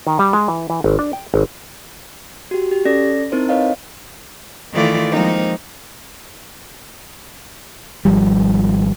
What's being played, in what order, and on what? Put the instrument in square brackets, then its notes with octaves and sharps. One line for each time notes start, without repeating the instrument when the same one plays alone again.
[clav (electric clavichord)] D#3
G3
G#3
E3
E3
G#1
D4
G5
G#1
[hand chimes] F#4 G4
G4
C#4 A4 D5 A#6
C4 D#4 E4 A#4 C5
B4 C#5 D#5 F5
[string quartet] D#3 E3 A3 F4 D5
F3 G#3 A#3 C4 D#4
[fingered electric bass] G#1 F3 G3